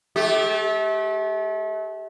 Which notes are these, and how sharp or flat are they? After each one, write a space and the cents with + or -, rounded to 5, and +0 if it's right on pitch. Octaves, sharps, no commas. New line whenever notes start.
A3 -35 G4 +0